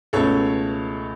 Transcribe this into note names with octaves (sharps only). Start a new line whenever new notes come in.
C#2 B2 A3 C#4 A4 C#5